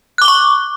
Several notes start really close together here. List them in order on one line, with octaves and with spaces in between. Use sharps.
F#6 D6 G7 C#6